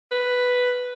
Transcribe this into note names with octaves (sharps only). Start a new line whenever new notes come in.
B4